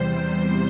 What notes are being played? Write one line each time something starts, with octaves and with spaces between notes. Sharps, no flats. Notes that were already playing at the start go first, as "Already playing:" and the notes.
Already playing: E2 C3 G3 C5